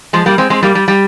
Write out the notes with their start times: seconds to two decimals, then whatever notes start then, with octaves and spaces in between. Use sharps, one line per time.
0.13 F3 G#3
0.26 G3 A#3
0.38 G#3 C4
0.50 G#3 C4
0.63 G3 A#3
0.75 G3
0.88 G3